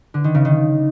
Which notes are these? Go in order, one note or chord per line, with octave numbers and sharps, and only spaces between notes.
D3
D#3
C#3
D#3